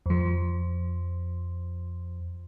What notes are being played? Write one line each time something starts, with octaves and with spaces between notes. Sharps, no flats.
F2 F3